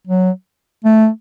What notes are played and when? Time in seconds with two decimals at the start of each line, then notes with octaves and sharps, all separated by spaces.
0.07 F#3
0.85 A3